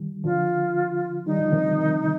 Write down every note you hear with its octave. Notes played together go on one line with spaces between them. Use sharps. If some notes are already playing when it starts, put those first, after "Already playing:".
Already playing: D#3 G3
D3 F3 F4
D#3 G3 D#4
D3 F3
C3 D#3
C3 D#3